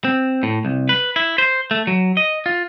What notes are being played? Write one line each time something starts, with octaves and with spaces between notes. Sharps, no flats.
C4
A2
C2
B4
E4
C5
A3
F#3
D#5
F4